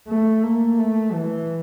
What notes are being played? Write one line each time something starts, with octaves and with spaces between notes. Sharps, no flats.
A3
A#3
A3
E3